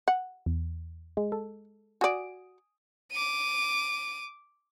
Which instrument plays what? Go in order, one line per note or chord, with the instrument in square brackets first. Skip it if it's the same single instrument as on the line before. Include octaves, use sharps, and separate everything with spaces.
[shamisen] F#5
[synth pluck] E2
G#3
A4
[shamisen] F#4 D5 [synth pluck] G#5 D#6 D7
[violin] D6 D#7